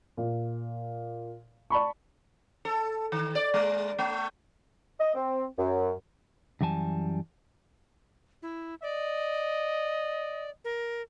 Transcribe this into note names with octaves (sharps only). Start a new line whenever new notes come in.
A#2
D5 A5 B5 C#6
A4
D#3
D5
G#3
A3
D#5
C4
F#2
F#2 E3 G3 G#5 A5
E4
D5 D#5
A#4